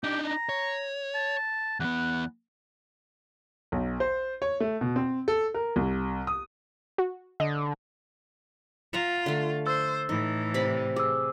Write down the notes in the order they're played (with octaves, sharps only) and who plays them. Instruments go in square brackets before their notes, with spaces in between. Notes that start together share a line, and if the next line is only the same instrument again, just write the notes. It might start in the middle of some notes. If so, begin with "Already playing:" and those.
[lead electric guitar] D4 D#4 [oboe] G4
[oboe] A#5
[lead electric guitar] C#5
[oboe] A5
[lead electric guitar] E2 B3 [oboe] F#5
[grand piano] B1
C5
C#5
A3
B2
C4
A4
A#4
C2
D#6
[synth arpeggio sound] F#4
[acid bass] D3 [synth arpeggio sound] D#5
[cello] F4 [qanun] E5 F#5 A#5
[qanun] D3 A3
[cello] C5 [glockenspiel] E6 A6
[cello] A2 E3 [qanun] D#4
[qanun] C3 D5 B5
[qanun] G#4 [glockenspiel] D6 E6